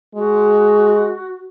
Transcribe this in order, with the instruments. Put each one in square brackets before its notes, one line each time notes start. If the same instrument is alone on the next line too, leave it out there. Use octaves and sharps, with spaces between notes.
[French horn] G#3 [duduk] F#4